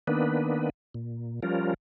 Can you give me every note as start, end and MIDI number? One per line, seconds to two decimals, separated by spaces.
0.08 0.70 51
0.08 0.70 58
0.08 0.70 59
0.08 0.70 62
0.08 0.70 71
0.95 1.40 46
1.43 1.74 53
1.43 1.74 55
1.43 1.74 61
1.43 1.74 65
1.43 1.74 70